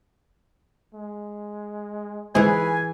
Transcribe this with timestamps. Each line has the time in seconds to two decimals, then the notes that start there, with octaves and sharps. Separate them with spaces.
0.94 G#3
2.35 G#2 E3 G#4 B4 G#5